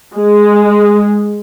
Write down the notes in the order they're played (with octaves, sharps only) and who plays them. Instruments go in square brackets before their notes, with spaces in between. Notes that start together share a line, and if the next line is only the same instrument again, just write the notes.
[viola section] G#3